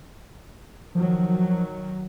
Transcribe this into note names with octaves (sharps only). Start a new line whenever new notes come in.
D#3 F3 F#3